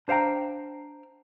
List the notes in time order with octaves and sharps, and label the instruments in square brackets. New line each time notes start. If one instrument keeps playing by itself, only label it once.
[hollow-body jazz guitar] D4 C5 F5 G5 A#5